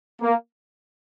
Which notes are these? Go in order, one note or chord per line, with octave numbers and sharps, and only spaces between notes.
A#3